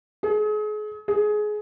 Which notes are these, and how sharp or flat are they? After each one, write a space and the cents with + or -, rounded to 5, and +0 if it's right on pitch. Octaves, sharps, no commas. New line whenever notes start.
G#4 +35
G#4 +20